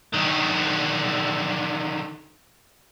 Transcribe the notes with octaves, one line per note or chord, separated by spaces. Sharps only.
D3 D#3